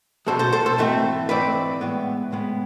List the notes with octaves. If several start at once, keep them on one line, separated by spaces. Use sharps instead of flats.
E2 B2 G#3 A4 C5
A4 C5
A4 C5
A4 C5
G#2 E3 A3 C4
G#2 E3 A3 C4 B4 D5
A2 G#3 B3
A2 G#3 B3